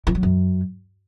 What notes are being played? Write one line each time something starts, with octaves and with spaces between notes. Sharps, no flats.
E3
F#3
F#2